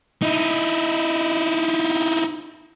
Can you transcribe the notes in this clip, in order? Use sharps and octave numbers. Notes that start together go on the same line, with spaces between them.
D#4 E4